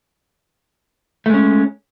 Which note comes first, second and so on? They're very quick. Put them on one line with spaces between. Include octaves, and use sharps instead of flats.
A3 G#3 C#4